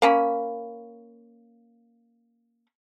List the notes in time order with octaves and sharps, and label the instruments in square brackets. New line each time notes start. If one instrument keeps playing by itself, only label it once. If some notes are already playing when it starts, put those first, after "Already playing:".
[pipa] A#3 C#4 B5